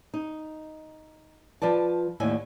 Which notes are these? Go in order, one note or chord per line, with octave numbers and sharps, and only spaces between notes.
D#4
F3 B4 D5 A5
D#2 A2 D3 E5 G#5